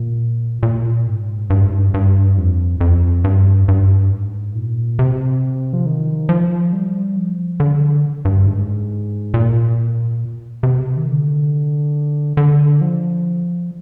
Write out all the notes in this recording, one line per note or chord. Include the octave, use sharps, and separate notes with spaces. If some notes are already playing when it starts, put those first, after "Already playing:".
Already playing: A#2
A#2
G#2
G2
G#2
G2
G2
F2
F2
G2
G2
G#2
A#2
C3
F3
D#3
F3
G3
F3
D3
G2
G#2
A#2
C3
D#3
D3
D3
F3